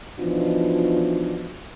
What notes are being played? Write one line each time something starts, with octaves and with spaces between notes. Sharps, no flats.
B2 E3 F3 D4 D#4 F4